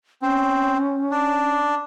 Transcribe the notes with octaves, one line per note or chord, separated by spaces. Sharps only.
C4 C#4
D4